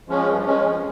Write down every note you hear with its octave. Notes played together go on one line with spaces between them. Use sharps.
F3 G#3 C#4
G2
F3 G#3 C#4
F2